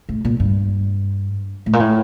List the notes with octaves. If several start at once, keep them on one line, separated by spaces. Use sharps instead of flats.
A2
A#2
G2
A2
A#2
A2